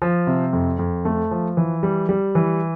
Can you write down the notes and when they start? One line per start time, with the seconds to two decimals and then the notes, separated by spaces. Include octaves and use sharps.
0.02 F3
0.27 C3
0.53 F2
0.79 F2
1.05 A3
1.31 F3
1.57 E3
1.83 G3
2.09 G3
2.35 E3